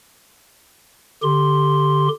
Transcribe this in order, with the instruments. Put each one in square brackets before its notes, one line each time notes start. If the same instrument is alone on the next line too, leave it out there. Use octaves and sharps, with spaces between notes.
[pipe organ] D3 G4 C6